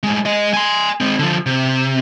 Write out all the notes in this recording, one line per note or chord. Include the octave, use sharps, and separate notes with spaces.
A2 G#3
G#3 D#5
G#5 C6
G#3 C4
D3 F3
C3